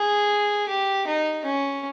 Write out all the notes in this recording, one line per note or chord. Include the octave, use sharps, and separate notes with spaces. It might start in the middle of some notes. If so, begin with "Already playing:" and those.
Already playing: G#4
G4
D#4
C#4